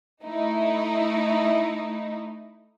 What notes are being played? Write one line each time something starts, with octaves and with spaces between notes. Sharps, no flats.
A3 D#4 E4